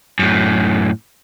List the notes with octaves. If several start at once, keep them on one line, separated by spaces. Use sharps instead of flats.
F#2 A2